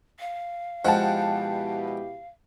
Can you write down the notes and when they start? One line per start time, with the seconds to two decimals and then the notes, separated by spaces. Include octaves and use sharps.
0.20 F5
0.85 B2 F3 G#3 E4 G4 F#5 G5 A5